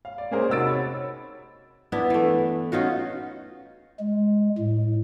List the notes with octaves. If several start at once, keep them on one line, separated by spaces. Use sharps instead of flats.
F5
D5
A#3 C#4 G#4 A#4 C5
C3 D#4 F#4 E6 A6 D7
C#5 B5
B3 D4 E4
E3 A3
C#4 D#4 F4 F#4
G#3
A2